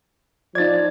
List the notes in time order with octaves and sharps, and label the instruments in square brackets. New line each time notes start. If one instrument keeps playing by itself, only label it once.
[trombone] F3 [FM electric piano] D#4 D5 [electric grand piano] G#6 A6